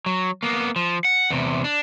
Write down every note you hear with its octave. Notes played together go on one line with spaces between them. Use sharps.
F#3
A#3 B3
F3
F#5
E2 C3
D4